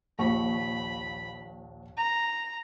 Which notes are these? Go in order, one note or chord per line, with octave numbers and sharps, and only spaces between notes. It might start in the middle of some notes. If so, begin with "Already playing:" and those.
A#1 D#2 B5 C#6
A#5